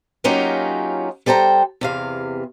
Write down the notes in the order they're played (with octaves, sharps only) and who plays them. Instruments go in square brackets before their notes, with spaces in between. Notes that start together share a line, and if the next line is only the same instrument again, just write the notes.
[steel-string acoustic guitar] F#3 A#3 C#4 D#4 F4 G4
G3 A4 C5 G5 A#5
E2 C3 F5